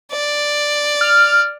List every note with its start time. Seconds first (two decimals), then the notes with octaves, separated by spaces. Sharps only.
0.12 D5
1.01 F6